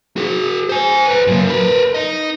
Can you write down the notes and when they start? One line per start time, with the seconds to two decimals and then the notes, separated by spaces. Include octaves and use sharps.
0.16 F#4 G#4
0.69 C5 G#5
1.07 B4 A#5
1.27 F#2 A#3
1.48 A#4 B4
1.94 D#4 D#5